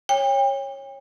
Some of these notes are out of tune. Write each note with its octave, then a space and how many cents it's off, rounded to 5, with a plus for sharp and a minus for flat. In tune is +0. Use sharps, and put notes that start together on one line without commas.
C#5 -15 G5 +40